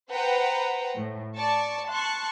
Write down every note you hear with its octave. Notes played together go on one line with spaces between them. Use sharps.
B4 C5 F#5 G5 A#5
A2
D5 A5 C#6
A5 C6 C#6 F#6